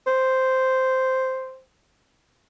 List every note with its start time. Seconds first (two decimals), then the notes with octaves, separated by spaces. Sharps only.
0.07 C5